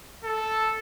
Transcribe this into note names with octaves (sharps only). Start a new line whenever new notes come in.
A4